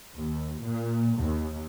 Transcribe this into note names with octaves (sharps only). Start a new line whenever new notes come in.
D#2
A#2
D#2